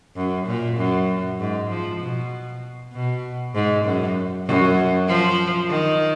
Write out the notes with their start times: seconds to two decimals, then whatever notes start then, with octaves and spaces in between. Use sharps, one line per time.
0.16 F#2
0.46 A#2
0.78 F#2
1.39 G#2
1.70 F3
2.00 B2
2.93 B2
3.54 G#2
3.85 F#2
4.47 F#2
5.08 F3
5.70 D#3